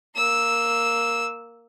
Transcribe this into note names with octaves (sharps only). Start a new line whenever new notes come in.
A#3 E6